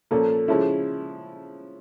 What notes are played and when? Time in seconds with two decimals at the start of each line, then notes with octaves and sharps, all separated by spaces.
0.11 A#2 F3 A#3 C#4 A4
0.48 C#3 F3 G#3 C#4 E4